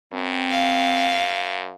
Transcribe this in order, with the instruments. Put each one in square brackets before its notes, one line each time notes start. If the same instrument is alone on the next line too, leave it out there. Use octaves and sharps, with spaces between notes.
[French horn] F#2 [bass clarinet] C4
[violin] F5